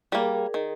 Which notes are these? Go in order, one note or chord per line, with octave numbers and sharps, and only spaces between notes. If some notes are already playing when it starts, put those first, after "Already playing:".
G3 A#3 G#4 A#4
D#3